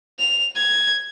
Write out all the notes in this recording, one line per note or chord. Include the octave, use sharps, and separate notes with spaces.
F7
G#6